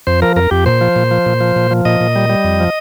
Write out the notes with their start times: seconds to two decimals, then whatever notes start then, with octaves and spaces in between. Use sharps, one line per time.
0.07 F2 C5
0.22 F3 A#4
0.36 F2 A#4
0.51 F2 G4
0.66 A#2 C5
0.81 F3
0.96 A#2
1.11 F3
1.26 A#2
1.41 F3
1.56 A#2
1.71 F3
1.85 A#2 D#5
2.01 A#2
2.16 G3
2.30 G3
2.44 F2
2.60 F3